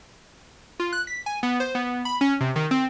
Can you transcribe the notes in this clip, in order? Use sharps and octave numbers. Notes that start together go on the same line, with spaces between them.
F4
F#6
B6
G#5
B3
C5
B3
B5
C#4
C3
D#3
C4